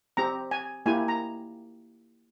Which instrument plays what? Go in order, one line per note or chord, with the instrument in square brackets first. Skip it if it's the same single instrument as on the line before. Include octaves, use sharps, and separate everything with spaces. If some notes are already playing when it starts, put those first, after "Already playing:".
[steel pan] C4 G4 A#5
G#5
A#3 E4 G4 G#5
A#5